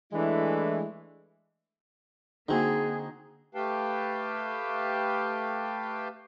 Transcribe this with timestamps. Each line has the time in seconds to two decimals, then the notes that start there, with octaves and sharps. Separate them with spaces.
0.13 E3 G#3 A3 D4 E4
2.49 D3 A#3 C4 D#4 F#4 G#4
3.55 A3 G4 B4 F5 G5 A5